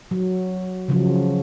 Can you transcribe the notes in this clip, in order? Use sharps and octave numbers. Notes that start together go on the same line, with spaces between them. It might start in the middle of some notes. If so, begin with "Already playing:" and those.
F#3
C#3 F3 F#3